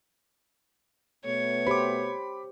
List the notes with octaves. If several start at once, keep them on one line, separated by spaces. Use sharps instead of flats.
B2 A3 B3 C#5
G4 C5 B5 D6